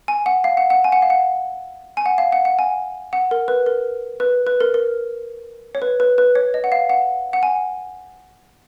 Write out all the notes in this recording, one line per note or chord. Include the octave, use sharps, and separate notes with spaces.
G#5
F#5
F5
F#5
F#5
G#5
F#5
F5
F#5
G#5
F#5
F5
F#5
F#5
G#5
F#5
A#4
B4
A#4
B4
B4
A#4
A#4
C#5
B4
B4
B4
C#5
D#5
F#5
F5
F#5
F#5
G#5